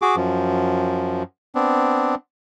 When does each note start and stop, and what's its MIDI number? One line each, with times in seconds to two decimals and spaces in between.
0.02 0.16 66
0.02 0.16 68
0.02 0.16 86
0.16 1.23 42
0.16 1.23 53
1.55 2.15 59
1.55 2.15 60
1.55 2.15 62